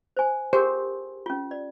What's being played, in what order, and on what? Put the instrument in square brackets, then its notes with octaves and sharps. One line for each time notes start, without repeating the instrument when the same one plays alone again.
[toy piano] C5 G#5
[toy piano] G4 G#4 A#4 [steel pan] C5
[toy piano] C#4 F4
D5